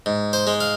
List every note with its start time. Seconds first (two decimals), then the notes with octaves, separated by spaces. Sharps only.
0.06 G#2
0.33 C5
0.47 G#3
0.61 F5